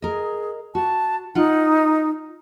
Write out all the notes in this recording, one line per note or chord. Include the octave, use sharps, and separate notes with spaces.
G#4 A#4 D#5
F#4 A5
D#4 F4 F#5